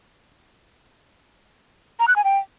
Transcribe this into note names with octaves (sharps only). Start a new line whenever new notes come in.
A#5
F#6
G#5
G5